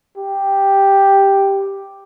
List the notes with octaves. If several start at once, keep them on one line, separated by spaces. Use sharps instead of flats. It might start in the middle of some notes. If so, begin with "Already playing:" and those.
G4